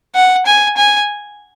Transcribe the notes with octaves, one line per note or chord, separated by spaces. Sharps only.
F#5
G#5
G#5